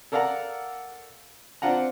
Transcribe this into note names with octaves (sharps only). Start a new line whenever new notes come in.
A4 A#4 D5 F5 F#5 A#5
C4 D4 F4 F#5 A#5